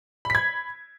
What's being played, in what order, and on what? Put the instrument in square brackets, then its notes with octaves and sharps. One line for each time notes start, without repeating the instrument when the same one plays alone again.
[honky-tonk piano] B5
B6
G#6